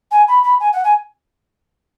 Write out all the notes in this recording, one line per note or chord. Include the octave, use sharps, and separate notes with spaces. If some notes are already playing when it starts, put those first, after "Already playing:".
G#5
B5
B5
G#5
F#5
G#5